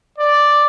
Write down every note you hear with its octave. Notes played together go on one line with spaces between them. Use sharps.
D5